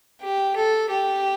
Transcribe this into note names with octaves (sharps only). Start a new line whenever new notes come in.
G4
A4
G4